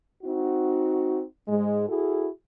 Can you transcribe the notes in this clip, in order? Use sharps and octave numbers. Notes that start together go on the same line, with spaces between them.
C4 D#4 F#4
G#2 G#3
E4 F#4 G#4 A4